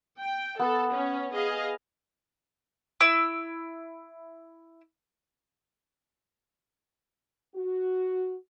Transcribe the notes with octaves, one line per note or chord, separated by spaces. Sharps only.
G5
B3 A4 B4
C#4
G#4 D#5 F5
E4 E6
F#4